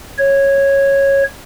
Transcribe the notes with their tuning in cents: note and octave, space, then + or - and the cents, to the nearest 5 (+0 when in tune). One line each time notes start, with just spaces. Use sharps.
C#5 -10